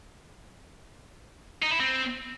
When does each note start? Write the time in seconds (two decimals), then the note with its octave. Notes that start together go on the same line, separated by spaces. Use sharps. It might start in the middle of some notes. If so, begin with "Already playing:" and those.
1.63 D#4
1.71 E4
1.80 C4